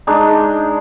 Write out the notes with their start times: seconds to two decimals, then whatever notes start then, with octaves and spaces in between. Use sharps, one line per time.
0.07 G#3 D4 D#4